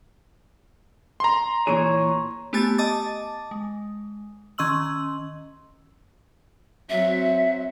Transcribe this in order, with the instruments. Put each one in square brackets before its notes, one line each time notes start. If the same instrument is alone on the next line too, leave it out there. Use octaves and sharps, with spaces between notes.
[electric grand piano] A#5 C6
[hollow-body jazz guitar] A#2 E3 G#4 [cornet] C#5
[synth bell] A3 B3 G4 G#5 A5 A6
D#5 A5 D6 D#6 A6
G#3
D#3 C#4 D#5 C6 E6 F#7
[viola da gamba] F#3 C4 F#4 [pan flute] E5